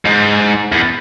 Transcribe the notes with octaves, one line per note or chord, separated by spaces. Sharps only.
G#2
E2